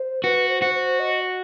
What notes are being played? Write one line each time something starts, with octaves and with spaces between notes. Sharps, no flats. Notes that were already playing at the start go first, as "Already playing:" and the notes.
Already playing: C5
F#4 B4
C5
F#4
C5
D#5